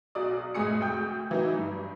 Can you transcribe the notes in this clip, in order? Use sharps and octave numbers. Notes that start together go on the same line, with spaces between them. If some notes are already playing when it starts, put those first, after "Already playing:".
B1 F#3 D5 D#6
F1 A2 G#3 G#4 D#6 C#7
D2 G5 G6
E3 F#3 D#4
G2